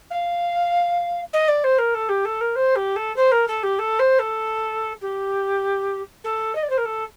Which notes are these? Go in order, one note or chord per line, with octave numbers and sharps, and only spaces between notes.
F5
D#5
D5
C5
A#4
A4
G4
A4
A#4
C5
G4
A4
C5
A#4
A4
G4
A4
C5
A4
G4
A4
D#5
D5
C5
A#4
A4